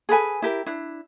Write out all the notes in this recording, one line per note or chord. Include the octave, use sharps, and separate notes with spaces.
G#4 A4 B4 G#5
E4 G4 A#4
D4 E4